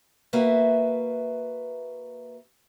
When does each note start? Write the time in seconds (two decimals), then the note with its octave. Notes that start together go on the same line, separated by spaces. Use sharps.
0.33 A#3 F#4 B4 E5